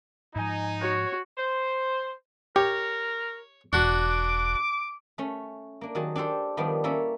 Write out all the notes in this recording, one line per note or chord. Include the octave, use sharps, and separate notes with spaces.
G#2 F3 D#4 G#5
F#4 C#5
C5
G4 A#4 C#5
E1 D4 F#4 D6
A3 C#4
A#3 D4
D#3 F#3 F#4 G#4 A5
D4 G4 A4 C5
D#3 F3 G3 B3 D4
A#3 C#4 E4 A4 E5